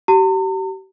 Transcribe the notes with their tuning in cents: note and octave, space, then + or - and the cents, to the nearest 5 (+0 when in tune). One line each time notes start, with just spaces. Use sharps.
G4 -40 A#5 -45